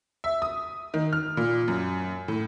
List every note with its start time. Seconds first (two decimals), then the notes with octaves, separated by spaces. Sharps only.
0.24 E5
0.42 D#6
0.94 D#3
1.13 F6
1.37 A#2
1.68 F#2
2.28 A2